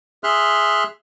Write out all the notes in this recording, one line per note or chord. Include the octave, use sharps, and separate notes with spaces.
G#4 E5 C6 F6 F#6